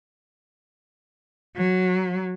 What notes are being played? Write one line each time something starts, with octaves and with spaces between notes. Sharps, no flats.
F#3